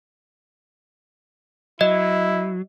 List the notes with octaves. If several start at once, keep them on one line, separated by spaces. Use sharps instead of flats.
F#3 E4 D#5